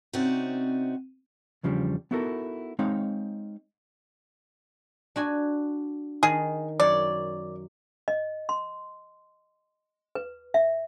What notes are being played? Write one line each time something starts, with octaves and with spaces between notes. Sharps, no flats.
C3 C4 C#4 D#4 F#4 D5
E2 C#3 F3 G3 C4 D4
B3 D#4 E4 F#4 A4 A#4
G#3 C4 D#4 C#5 F5
D4 F#4 G#5
D#3 G#4
F#2 C#5 D5
D#5
C6
B4
E5